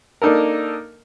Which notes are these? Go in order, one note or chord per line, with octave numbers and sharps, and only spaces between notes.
A#3 D4 D#4 A4 A#4